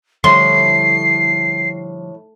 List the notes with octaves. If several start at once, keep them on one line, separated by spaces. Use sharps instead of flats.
A2 D3 F3 G3 C6 C7